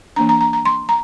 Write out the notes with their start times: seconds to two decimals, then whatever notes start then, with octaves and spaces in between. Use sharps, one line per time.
0.16 E3 A#3 D4 A#5
0.29 A#5
0.41 A#5
0.53 A#5
0.66 C6
0.89 A#5